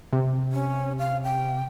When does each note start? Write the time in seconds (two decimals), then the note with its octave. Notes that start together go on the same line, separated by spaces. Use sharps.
0.13 C3
0.52 C#4
0.99 F5
1.24 G5